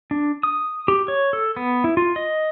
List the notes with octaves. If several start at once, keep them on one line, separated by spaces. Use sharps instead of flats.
D4
D#6
G4
C#5
A4
B3
E4
F4
D#5